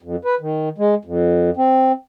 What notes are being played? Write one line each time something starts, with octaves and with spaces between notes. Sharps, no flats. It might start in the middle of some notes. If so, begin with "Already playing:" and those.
F2
B4
D#3
G#3
F2
C4